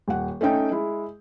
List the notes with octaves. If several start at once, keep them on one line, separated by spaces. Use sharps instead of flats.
D#1 F#5
A3 C#4 D#4 G5
G#3 E4